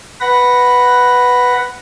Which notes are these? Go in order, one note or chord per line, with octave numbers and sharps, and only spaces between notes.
B4 F#5 B5 A#6